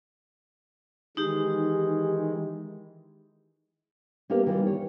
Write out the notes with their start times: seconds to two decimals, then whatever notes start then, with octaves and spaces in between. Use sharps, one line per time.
1.17 D#3 E3 G#3 D#4 G4
4.30 A#3 B3 E4 G4 A#4 B4
4.46 D#3 E3 G3 F4
4.66 C#5